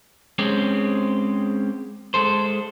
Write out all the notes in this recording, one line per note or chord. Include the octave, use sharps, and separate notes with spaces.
G#3 C4 C#4 G4
G#3 A4 C5